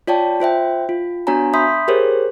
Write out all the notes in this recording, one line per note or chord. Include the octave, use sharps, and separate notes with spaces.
F4 C#5 D5 G5 A5
F4 C5 E5 G5
F4
B3 D4 F#4 C#5 G#5 A#5
E5 B5 C6 D#6 G6 B6
G4 G#4 A#4 C5 C#5